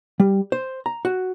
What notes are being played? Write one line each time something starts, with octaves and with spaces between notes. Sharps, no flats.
G3
C5
A#5
F#4